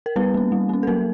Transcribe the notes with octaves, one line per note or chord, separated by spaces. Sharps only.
A#4
G3 B3 B4
A#3 C#4
G3
A#3 C#4
A4
F#3 A#3 A#4